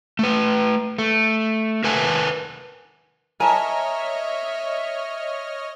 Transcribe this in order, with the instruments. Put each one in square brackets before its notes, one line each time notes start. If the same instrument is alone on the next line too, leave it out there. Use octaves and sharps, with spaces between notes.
[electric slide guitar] A3 B4
A3
A#4 B4 E5 F#5 G#5 A5
[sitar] A#4 [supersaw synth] C#5 D#5 F6 [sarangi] E5 [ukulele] G#5 A5